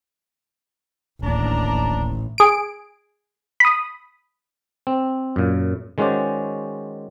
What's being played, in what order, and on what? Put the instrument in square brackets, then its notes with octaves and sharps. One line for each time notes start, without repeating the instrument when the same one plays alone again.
[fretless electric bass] D1 D#2 [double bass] A1 [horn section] D4 D5 A#5
[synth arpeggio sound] G#4 D7
B5 D#6
[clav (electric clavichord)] C4
F#2 A#2
D#3 G#3 C#4 F#4 C5 D5